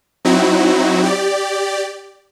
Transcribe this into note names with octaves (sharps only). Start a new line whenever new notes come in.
F#3 C4 D#4 E4 F#4
G4 D5